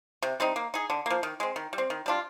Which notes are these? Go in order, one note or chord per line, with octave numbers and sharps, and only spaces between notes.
C3
G3 C4 D#4
A#3
D#4 G#4
D3
F3 A#3
D#3
G#3 C4
D#3
G3
C4
D#3
G3 D4 F4